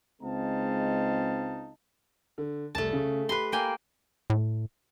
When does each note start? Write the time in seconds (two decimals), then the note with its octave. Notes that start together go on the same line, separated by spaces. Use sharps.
0.22 C#2 G#3 C4 D#4 F5 A5
2.38 D3
2.75 C2 G3 A3 A5
2.93 C#3
3.29 G4 B4 B5 C6
3.52 A#3 G5 G#5
4.30 A2